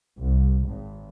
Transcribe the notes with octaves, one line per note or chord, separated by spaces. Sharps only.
C2
G#1